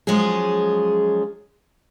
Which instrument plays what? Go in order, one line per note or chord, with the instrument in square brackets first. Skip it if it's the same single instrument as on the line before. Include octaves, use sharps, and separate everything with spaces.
[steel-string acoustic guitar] F3 F#3 G#3 C#4 F4 G#4